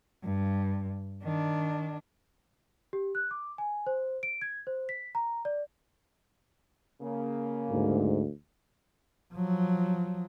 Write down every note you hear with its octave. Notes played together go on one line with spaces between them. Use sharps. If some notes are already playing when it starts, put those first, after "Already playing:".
G2
D#3 D4
G4
F#6
D6
G#5
C5
D7
G#6
C5
B6
A#5
D5
C#3 A#3
D2 G#2
F3 F#3